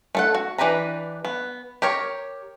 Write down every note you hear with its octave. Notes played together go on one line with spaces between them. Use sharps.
A3 A4 F#5
F#4
E3 D4 G4 B4 A#5
B3
G4 A#4 C#5